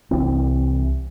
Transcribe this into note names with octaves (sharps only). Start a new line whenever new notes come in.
C2 E3 C4